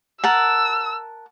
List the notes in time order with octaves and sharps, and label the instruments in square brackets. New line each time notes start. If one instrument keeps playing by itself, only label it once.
[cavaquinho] A#4 F#5 A5 [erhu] E6